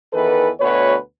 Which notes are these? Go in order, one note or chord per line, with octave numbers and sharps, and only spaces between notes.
E2 D#3 E3 A4 B4
D2 B2 B4 C#5